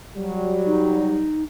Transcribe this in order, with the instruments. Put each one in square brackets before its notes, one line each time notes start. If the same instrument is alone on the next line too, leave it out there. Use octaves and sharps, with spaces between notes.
[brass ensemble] F#3 G3
[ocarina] D#4